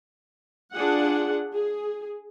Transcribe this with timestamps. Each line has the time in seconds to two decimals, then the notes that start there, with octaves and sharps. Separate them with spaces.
0.74 D4 F4 G#4 F#5
1.54 G#4